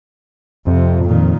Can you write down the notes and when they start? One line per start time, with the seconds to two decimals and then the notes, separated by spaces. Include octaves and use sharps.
0.67 F2 C3
1.05 A#2 D#3